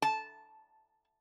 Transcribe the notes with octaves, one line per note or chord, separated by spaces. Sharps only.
A5